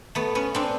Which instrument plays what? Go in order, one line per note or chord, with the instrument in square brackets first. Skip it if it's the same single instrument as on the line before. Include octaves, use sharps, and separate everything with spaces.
[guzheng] A3 B3
B3 C#4
C4 D4